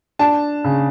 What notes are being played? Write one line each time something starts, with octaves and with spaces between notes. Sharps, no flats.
D4 A5
C#3